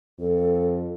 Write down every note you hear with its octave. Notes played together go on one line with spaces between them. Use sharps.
F2 A4